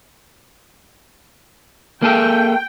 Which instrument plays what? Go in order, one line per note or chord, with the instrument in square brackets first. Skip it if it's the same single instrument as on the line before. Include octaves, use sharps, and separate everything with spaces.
[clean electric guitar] A#3 G#4 A4 [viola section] G5